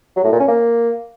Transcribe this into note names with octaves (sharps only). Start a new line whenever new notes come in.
F#3
A2
A#2
C#4
A#3